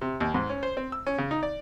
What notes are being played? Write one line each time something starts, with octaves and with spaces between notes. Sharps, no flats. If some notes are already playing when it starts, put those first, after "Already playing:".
C3
D#2
G#2
C#4
C5
C4
E6
C#4
C#3
D#4
D5